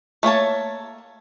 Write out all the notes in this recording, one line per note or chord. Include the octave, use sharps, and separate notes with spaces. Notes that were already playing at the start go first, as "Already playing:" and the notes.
A3 A#3 C#5 A5